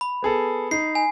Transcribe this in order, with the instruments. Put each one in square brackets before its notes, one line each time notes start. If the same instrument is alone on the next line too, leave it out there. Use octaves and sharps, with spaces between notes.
[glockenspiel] B5
[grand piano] B3 G#4 A4
[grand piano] D#4 [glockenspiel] C7
[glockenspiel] G#5